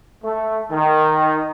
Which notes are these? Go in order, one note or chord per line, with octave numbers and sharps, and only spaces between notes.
A3
D#3